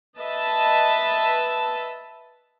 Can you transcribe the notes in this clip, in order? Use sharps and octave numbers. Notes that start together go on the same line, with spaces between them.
B4 D#5 E5 A5